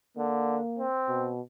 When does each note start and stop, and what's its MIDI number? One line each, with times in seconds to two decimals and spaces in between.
0.17 0.59 50
0.17 0.86 58
0.79 1.31 60
1.09 1.41 47